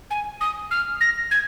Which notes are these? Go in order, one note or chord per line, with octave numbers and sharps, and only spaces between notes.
G#5
D#6
F6
A#6
G#6